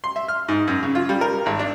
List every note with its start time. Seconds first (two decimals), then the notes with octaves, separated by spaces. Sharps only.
0.04 C6
0.16 E5
0.28 F6
0.48 G#2
0.67 F#2
0.83 C#3
0.95 F4
1.09 G3
1.21 A#4
1.46 G#1
1.59 D4